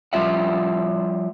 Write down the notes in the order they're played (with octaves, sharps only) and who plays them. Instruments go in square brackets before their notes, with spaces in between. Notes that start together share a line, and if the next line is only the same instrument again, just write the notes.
[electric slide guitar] F3 G3 F4 E5 F#5